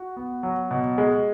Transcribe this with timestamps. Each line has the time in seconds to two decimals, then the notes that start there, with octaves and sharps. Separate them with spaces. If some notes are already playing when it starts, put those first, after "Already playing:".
Already playing: F#4
0.16 B3
0.43 F#3
0.71 B2
0.98 G#3